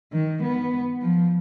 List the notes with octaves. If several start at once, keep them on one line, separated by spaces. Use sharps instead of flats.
D#3
B3
F3